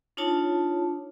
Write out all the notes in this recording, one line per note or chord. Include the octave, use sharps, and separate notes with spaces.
D4 D#4 F4 C#5 A5